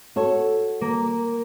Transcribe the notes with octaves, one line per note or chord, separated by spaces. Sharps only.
F#4 A4 C#5
A#3